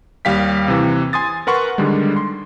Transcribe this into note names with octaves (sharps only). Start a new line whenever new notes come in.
D#2 G3 F5 G5 B6
C3 E3
G#5 C6 D#6 A6
A#4 B4 F#5 C6 C#6
D3 D#3 G3 G#3
C6